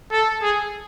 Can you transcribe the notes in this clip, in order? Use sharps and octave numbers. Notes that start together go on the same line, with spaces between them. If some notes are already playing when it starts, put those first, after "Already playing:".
A4
G#4